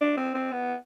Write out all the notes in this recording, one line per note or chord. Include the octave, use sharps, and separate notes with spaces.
D4
C4
C4
B3